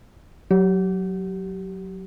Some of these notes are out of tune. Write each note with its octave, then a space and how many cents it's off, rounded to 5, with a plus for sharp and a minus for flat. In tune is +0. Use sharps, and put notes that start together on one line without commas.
F#3 +0 G4 -25